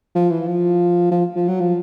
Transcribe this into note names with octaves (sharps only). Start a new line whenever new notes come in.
F3
E3
F3
F3
F3
F#3
F3